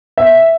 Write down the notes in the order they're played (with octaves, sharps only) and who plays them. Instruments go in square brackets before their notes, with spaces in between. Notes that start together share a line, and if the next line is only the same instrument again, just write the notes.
[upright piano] E5